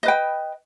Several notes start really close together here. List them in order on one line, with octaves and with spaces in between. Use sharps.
D#5 B4 G5